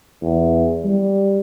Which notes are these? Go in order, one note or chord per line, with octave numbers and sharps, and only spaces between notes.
E2
G3